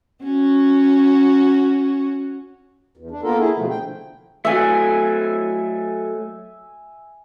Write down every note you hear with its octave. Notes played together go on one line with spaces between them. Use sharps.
C#4 F#4
E2
D4
A#3 B3 F4 A4 A#4
E4 G#4
B2 D3 F3 A3
G5
F#3 A3 E5 G#5